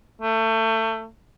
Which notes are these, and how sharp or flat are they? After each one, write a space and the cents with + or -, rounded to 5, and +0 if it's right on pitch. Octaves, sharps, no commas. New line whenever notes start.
A3 +25